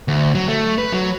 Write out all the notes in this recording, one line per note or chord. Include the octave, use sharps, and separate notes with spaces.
D2
F#3
A3
B4
F#3